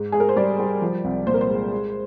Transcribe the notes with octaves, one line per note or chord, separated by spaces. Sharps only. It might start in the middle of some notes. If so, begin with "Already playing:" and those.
Already playing: G#2
G#2 G#4
A#4
C5
G3 D5
G3
F3
C2
A#2 C5
A#4
C5
G#3
G#3